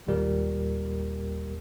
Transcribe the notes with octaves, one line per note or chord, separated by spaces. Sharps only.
G#1 D#2 A#2 G3 G4 A#4